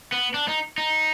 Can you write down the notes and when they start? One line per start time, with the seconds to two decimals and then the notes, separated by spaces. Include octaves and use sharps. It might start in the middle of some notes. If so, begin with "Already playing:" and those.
0.12 B3
0.34 D4
0.48 D#4
0.78 D#4